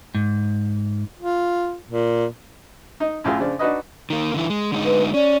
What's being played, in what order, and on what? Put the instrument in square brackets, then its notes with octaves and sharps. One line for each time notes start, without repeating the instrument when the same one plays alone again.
[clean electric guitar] G#2
[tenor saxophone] F4
A#2
[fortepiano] D#4
F#2 A2 F4 G#4
C#3 F3 D4
D4 D#4 F#4 B4 D#5
[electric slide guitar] D#3 A#3
D3 E3 E4
G#3
D3 G#3 D#4
[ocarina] B4
[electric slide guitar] C#4 [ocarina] D5